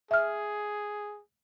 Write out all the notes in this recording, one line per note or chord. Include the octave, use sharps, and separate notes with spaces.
G#4 E5 F6